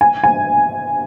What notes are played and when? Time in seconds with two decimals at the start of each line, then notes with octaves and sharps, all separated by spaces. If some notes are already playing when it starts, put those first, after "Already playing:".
0.01 G#5
0.24 G#5